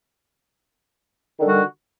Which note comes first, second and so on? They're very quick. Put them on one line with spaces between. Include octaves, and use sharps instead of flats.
D#3 D3 G3 F#4 D4